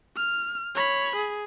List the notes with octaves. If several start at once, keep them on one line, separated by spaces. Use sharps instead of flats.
F6
C#5 B5
G#4